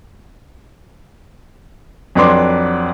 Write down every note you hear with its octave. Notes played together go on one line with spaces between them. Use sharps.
F2 F#3 D4 B4 C6 D6